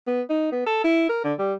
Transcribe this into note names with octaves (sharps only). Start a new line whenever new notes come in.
B3
D#4
B3
A4
E4
A#4
D3
G3